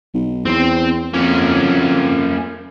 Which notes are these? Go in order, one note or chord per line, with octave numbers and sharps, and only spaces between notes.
B1
E2 C4 C5
F2 A#3 C#4